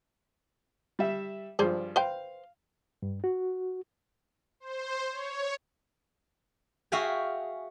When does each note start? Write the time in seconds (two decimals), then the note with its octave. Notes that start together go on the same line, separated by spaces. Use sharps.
0.99 G3 E5
1.59 G2 F3 G#4 C5 D5
1.96 B4 C5 F5 G5
3.02 G2
3.24 F#4
4.60 C5
5.11 C#5
6.92 F#4 G#4 E5 F5 G5 G#5